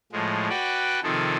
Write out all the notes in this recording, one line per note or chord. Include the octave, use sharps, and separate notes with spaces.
A2 F3 G#3
F#4 B4 D5 G5
C3 D#3 F3 G#4 A4